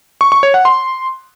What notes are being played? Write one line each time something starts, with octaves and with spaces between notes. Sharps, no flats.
C#6
C#6
C#5
F#5
C6